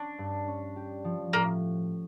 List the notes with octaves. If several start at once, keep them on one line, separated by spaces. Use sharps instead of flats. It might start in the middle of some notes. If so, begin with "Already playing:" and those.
Already playing: C#4 D4
G2
C#4
G4
F3
A2 A#3